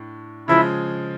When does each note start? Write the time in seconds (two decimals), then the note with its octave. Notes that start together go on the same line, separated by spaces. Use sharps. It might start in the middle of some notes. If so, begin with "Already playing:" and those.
Already playing: A2 D4
0.48 C#3 F3 G#3 E4